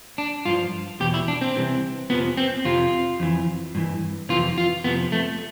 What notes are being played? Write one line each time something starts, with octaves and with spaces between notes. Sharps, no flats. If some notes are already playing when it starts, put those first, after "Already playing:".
D4
G2 F3 F4
E2 B2 G4
E4
D4
C4
C2 C3 E3
F2 C3 F3 B3
C4
F2 C3 F3 F4
F2 E3
G2 E3
F2 C3 E3 F4
F4
F2 C3 F3 B3
A3